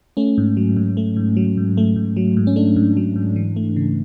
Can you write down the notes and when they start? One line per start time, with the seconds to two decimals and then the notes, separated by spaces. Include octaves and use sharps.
0.17 A3 C#4
0.38 G#2
0.57 F#3
0.77 G#2
0.97 A3
1.16 G#2
1.37 F#3
1.57 G#2
1.77 A3
1.96 G#2
2.17 F#3
2.37 G#2
2.47 C#4
2.56 A3 D4
2.76 G#2
2.97 F#3
3.16 G#2
3.36 E3
3.56 A3
3.76 C#3